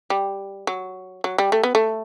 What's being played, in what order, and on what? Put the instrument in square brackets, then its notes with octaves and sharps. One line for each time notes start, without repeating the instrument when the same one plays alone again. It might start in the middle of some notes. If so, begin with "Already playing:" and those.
[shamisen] G3
F#3
F#3
G3
A3
B3
A3